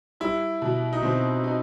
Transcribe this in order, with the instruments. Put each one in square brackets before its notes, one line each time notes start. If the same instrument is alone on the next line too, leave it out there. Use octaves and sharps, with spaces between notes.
[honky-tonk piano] G3 [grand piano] E4
[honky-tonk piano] B2
[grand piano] D#4
[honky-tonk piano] B2 [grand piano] C4
[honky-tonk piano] D#4